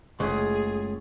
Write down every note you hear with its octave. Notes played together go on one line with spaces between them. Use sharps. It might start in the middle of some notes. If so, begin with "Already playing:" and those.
F#1 C#2 A3 G#4